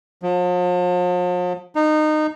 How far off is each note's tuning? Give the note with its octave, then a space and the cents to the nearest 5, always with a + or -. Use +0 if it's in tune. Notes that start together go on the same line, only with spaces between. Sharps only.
F3 +45
D#4 -20